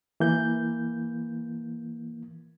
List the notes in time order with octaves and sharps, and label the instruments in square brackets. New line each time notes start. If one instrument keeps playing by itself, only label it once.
[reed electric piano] E3 A#3 G6